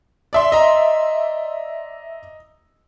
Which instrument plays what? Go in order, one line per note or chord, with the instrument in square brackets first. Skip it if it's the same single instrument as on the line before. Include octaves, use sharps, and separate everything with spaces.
[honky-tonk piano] D5 E5 C6
[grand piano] D#5 A#5